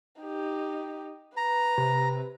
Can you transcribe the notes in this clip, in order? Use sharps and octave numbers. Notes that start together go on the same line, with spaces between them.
D#4 G4
B4 A#5
C3